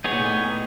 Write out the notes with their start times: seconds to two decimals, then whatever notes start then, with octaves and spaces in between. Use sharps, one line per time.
0.04 B3 D#4 G#4 C#5
0.11 A#2
0.21 A2